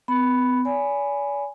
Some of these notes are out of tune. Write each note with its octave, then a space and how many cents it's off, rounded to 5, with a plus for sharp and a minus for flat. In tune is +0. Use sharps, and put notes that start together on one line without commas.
B3 +45 B5 +0
D5 -45 G#5 +0 B5 +0